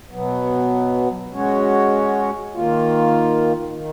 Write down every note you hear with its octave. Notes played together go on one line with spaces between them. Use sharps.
B2 F#3 B3
G#3 C#4 F#4 C#5
D#3 A#3 F4
D#3